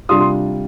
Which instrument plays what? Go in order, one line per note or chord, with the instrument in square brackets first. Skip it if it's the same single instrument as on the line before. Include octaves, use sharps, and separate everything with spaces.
[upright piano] C3 G3 D4 F4 [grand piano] C6 D#6
[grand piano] C6